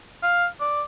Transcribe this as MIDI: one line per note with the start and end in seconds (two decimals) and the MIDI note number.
0.23 0.46 77
0.61 0.83 74